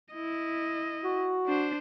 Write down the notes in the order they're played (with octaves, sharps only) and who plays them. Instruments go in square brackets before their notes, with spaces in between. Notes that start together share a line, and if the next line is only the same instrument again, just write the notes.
[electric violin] E4 D#5
[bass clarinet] F#4
[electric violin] D4 C5